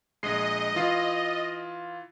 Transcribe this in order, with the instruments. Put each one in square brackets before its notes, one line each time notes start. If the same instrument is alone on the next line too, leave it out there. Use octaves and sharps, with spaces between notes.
[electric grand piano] A#1 G#3 C7 [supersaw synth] D#5
[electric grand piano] E3 F4 C7